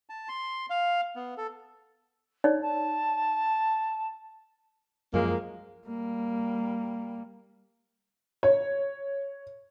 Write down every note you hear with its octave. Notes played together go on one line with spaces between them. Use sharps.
A5
C6
F5
B3
A4
D#4 C#5 D5
A5
F#2 F3 G#3 A#3
G3 A#3
C#5